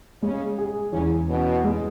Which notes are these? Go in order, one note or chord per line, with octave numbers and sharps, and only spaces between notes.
C#3 G#3 C#4
G#4
E2 C#3 C#4
B2 B3 C#4
G#3